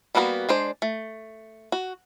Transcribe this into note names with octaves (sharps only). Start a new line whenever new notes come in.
G3 A#3 B3 F4 F#4
G#3 D4 C5
A3
F#4